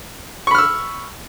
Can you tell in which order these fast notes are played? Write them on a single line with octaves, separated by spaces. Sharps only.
C#6 B5 F6 E6